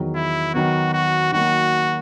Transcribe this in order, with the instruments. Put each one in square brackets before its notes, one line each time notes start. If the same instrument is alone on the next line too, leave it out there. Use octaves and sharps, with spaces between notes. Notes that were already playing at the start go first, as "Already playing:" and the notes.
Already playing: [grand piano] E2 D#3 F#3
[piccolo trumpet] E4
[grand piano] D#3 F#3 B3 [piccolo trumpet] F#4
[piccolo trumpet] F#4
[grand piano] D#3 F#3 A#3 [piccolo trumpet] F#4